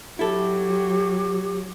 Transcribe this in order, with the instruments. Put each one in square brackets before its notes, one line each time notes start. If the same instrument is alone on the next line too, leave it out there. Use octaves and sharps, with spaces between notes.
[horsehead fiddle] F#3 [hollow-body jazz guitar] E4 A4 [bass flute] G4